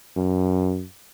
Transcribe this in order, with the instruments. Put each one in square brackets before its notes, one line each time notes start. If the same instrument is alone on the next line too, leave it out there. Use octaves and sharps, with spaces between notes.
[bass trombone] F#2